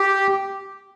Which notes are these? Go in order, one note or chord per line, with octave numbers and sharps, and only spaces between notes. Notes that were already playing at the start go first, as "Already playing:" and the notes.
Already playing: G4